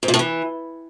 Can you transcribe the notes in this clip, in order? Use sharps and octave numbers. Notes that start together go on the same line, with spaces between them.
G#2
A#2
A2
E3